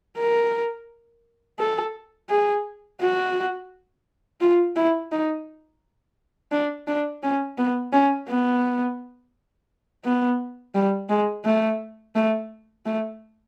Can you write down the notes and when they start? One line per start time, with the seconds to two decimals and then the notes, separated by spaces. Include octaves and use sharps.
0.18 A#4
1.59 A4
2.29 G#4
3.01 F#4
4.41 F4
4.76 E4
5.12 D#4
6.52 D4
6.87 D4
7.23 C#4
7.58 B3
7.93 C#4
8.28 B3
10.04 B3
10.74 G3
11.09 G#3
11.44 A3
12.15 A3
12.86 A3